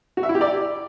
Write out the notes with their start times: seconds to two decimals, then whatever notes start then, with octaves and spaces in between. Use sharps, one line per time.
0.17 F#4
0.23 E5
0.29 E4
0.35 G4
0.41 D5